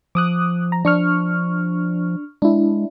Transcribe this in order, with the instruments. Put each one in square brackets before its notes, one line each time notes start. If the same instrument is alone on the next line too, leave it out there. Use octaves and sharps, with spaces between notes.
[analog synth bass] F3 [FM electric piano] D6 D#6 F#6
[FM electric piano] A#5
[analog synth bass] F3 [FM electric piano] D4 C#6 F6
[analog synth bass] G#3 [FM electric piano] D4 E4